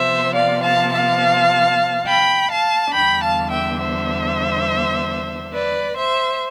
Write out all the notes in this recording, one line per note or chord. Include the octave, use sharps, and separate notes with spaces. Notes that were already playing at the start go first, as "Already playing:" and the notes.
Already playing: C3 F3 B3 C5 E5
D5 F5
F5 A5
F5 A5
G5 B5
F5 A5
E2 D3 G3 B3 D4 G5 B5
F5 A5
E5 G5
C5 E5
B4 D5
C5 E5